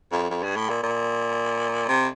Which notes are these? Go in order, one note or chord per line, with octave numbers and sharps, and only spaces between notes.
F2
F2
G2
A2
A#2
A#2
C3